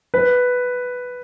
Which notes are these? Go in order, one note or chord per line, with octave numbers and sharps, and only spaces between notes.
B4